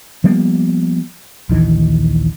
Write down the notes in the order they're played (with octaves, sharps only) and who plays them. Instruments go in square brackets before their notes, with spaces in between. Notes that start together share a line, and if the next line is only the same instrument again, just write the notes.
[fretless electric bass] F3 G3 A#3 B3
A#1 D#2 D#3 E3